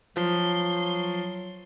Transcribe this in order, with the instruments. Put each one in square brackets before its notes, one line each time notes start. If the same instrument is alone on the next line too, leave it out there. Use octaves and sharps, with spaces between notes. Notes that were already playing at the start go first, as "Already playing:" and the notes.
[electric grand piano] F3 [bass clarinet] F#3 [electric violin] C6